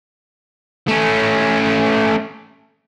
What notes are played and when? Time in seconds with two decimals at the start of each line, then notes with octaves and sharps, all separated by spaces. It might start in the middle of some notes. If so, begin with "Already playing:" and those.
0.88 A3 C#4